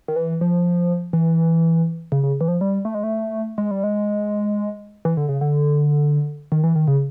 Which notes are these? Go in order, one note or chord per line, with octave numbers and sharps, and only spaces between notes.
D#3
E3
F3
E3
C#3
C#3
E3
F3
G3
A3
G#3
A3
G#3
G3
G#3
E3
D3
C#3
D3
D#3
E3
D#3
C#3